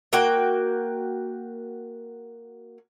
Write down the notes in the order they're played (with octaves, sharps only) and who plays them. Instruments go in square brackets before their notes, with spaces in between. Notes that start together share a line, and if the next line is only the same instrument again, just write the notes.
[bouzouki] A#3 F#4 G5